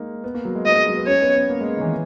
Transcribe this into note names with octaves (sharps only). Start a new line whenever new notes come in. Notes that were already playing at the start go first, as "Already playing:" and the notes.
Already playing: G#3 A#3 D#4
B3
A#3
F#3
G#3
F#3 D#5
G#3
F#3
B3
C#4 C#5
B3
B3
A#3
G#3
D#3
E3